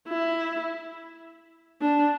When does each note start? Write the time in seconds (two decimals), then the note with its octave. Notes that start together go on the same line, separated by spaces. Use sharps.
0.08 E4
1.82 D4